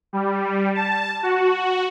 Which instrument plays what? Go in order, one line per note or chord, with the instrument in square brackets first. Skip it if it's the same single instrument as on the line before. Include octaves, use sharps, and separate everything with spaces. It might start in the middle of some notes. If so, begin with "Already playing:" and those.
[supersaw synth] G3
A5
F#4